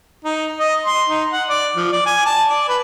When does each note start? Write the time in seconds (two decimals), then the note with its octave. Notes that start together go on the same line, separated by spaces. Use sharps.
0.25 D#4
0.60 D#5
0.85 C6
1.09 D#4
1.33 F#5
1.49 D5
1.76 F3
1.93 D5
2.06 G#5
2.26 A5
2.49 D5
2.69 B4